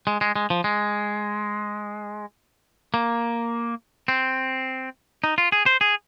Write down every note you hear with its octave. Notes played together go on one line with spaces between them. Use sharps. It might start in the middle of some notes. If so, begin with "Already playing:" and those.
G#3
G#3
G#3
F3
G#3
A#3
C4
D#4
F4
G#4
C5
G#4